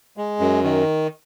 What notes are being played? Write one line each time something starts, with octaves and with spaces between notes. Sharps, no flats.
G#3
F#2
D#3